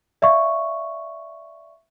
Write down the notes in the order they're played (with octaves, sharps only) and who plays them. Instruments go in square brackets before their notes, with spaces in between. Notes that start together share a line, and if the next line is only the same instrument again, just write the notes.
[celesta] D5 E5 F5 C#6